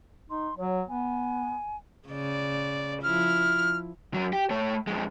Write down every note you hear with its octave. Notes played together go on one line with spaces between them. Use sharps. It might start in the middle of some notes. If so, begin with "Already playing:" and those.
D#4 C6
F#3 C#5
B3 G#5
C#3 D5
F3 E4 F6
F#2 F#3
G4
A3 C#5
F2 G#3